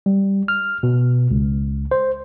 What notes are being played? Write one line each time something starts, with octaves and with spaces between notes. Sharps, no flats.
G3
F6
B2
C#2
C5